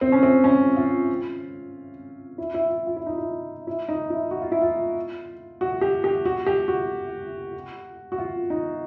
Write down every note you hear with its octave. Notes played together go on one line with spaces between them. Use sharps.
C4
C#4
C4
C#4
F4
E4
E4
F4
F4
E4
D#4
E4
E4
D#4
E4
F#4
F4
E4
F4
F#4
G4
G4
F#4
G4
F#4
F#4
F4
D#4